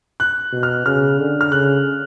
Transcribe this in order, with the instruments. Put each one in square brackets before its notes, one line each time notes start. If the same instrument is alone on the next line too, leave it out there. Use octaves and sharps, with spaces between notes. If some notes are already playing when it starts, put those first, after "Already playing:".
[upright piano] F#6
[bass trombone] B2
[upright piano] F6
[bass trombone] C#3 [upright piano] F6
[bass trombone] D3
[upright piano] F6
[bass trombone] C#3 [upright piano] F#6